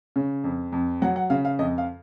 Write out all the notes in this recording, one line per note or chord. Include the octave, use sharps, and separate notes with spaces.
C#3
F2
F2
F#3 F#5
F#5
C#3 F5
F5
F2 D#5
F5